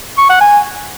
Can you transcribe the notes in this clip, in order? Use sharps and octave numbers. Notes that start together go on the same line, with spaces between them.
C#6
F#5
G#5